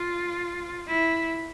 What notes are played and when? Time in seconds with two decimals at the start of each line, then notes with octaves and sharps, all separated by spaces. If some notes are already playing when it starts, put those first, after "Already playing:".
Already playing: F4
0.87 E4